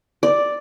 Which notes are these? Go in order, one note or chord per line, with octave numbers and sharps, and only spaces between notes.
D5